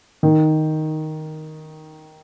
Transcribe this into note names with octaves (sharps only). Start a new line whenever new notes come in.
D#3